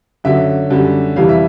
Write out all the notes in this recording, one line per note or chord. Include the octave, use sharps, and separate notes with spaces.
F#2 D3 F#3 E5
F#2 D3 G3
F2 C3 E3 G3 F5
E5